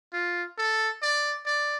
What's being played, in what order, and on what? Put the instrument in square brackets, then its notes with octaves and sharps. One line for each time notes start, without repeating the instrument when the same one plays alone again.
[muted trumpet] F4
A4
D5
D5